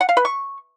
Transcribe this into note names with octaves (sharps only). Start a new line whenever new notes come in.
F#5
F5
B4
C#6